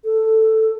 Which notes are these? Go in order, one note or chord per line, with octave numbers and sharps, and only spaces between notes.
A4